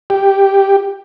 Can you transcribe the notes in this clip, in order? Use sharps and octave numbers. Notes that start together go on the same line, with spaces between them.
G4